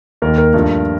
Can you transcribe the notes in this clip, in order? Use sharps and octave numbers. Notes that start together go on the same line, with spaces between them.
D#2 D#3 A#3 A#4
A#4
G2 F3 A3